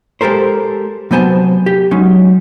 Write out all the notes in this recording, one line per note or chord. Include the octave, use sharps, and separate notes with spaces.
G#3 G4 A4 A#4 C5
C3 F#3 B3 C5 G#5 A5
G4
F#3 G#3 C#4 D#4